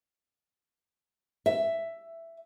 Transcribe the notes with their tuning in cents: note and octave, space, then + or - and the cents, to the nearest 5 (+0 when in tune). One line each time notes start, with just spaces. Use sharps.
E5 +10